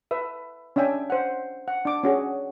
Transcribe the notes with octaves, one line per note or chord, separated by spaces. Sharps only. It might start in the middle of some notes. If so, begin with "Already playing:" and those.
B4 E5
C#4 D4 E5 G5 G#5
C5 F#5
F#5
D4 D6
C#4 F#4 G#4 C#5